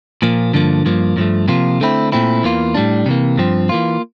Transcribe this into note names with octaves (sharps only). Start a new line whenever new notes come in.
A#2 F3 A#3
G2 D3 F3 A#3
G2 F3 A#3
G2 F3 A3
C3 F3 A#3 F4
D3 A3 C4 E4
A#2 A3 C4 E4
E2 E3 A#3 F4
A2 G3 D4
C3 E3 A#3
G2 F3 C4
E3 A#3 F4